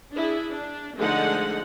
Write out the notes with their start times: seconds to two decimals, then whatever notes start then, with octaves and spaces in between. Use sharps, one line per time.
0.13 D4 E4 G#4
0.51 D4
0.97 D3 F3 G#3 A3 D#4 F#5